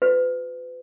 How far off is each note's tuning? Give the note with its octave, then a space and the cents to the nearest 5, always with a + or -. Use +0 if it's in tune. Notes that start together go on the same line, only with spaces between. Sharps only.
F#4 -45 B4 +35